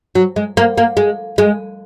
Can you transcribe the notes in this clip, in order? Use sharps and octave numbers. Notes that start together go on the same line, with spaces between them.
F#3
G#3
A#3
A#3
G#3
G#3